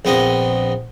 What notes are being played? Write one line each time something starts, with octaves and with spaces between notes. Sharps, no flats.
A#1 B3 C4 D#5